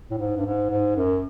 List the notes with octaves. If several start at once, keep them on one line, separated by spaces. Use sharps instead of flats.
A2
G#2
G2
G#2
G#2
F#2